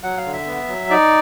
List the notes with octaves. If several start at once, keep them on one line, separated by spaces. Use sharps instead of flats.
F#3 F#5
F5
D3
E5
B3
F#3
D#4 D5